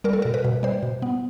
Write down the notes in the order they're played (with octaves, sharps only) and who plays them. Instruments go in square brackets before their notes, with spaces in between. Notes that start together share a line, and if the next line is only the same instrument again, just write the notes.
[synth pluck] G3 A#4
A4
B2 A#4
B4
B2
G3 C5
B2
B3